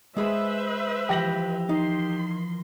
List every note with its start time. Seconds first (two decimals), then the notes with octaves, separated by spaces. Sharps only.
0.17 G#3 G#4 B4 C5 E5 B5
1.09 E3 F3 G4 A#6 F#7
1.69 D#3 D#4 C6